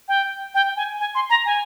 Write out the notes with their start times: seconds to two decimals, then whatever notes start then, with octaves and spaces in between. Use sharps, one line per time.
0.08 G5
0.54 G5
0.76 G#5
1.00 G#5
1.15 C6
1.30 A#5
1.46 G#5